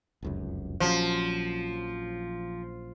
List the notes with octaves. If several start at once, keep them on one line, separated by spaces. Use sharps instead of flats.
F1 C#2 F#2
A#1 F3 F#3 C#4